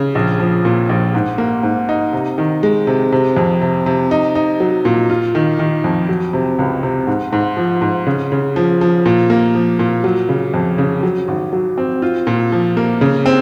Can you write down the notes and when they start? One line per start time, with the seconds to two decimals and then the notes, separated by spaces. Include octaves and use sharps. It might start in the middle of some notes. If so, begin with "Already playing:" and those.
Already playing: C#3
0.15 A#1
0.40 F3
0.65 A#2
0.89 A#1
1.15 G#2
1.38 A#3
1.63 G#2
1.89 D#4
2.13 C3
2.38 D#3
2.63 G#3
2.87 C3
3.12 C3
3.37 F2
3.62 C3
3.86 C3
4.11 D#4
4.35 D#4
4.60 F#3
4.85 A#2
5.10 F4
5.35 D#3
5.59 D#3
5.84 F2
6.09 F#3
6.33 C3
6.59 C#2
6.83 C3
7.07 G#2
7.32 G#2
7.57 F3
7.81 G#2
8.07 C#3
8.32 C#3
8.56 F3
8.81 F3
9.06 A#2
9.30 A#3
9.55 F3
9.79 A#2
10.04 F#3
10.29 C#3
10.54 F2
10.78 C#3
11.03 F#3
11.28 G#1
11.53 F#3
11.78 C4
12.02 F4
12.27 A#2
12.52 F3
12.77 A#3
13.01 C#3
13.26 C4